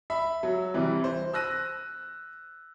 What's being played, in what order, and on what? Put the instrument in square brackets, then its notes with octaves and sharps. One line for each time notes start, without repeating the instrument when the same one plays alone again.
[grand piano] E5 B5
F#3
C3 E3 G3
C5
E6 F#6 A#6 D#7